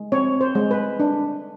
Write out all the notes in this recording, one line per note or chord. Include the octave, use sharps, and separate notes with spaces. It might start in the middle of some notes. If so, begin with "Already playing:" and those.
Already playing: G#3
C4 C#5
C5
G#3
B4
D4